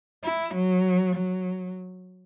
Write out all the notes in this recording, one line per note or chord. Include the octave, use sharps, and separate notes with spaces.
E4
F#3
F#3